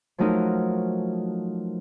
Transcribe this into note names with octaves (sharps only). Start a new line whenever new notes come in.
F3 F#3 A3 D#4 F#4 A#4